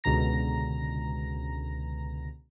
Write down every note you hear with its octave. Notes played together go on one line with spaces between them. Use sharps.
C#2 B2 D3 A#5 A#6